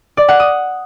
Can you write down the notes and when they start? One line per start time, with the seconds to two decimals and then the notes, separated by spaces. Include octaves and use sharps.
0.17 D5
0.28 F#5
0.40 D#6